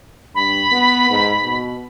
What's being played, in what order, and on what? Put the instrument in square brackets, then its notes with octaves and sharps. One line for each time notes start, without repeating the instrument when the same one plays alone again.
[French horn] G2 [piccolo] B5
[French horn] B3
G#2
B2